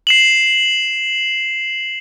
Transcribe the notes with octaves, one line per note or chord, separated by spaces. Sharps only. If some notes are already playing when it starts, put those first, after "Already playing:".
C7 E7 F#7